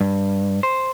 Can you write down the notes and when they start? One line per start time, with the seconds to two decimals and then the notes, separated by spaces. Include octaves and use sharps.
0.01 G2
0.63 C5